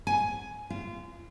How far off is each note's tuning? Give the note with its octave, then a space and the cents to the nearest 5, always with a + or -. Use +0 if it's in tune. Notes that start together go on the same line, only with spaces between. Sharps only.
G#5 +10
F4 -25